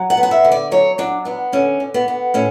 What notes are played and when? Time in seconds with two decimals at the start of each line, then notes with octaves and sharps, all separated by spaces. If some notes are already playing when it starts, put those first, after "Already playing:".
Already playing: F#3
0.10 F#5
0.17 B3
0.23 F#5
0.31 E5
0.45 D3
0.51 D5
0.71 F#3 C#5
0.98 F#3 D4
1.25 B3 D4
1.52 D3 C#4
1.80 D3
1.94 B3
2.08 B3
2.34 A2 C#4